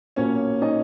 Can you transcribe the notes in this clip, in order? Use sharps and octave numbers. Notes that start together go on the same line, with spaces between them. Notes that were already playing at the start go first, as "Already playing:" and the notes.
B1 A#2 A#3 C#4 C#5
D#4 D#5